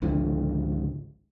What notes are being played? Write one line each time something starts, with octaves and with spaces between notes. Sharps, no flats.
G#1 C#2 D3 F3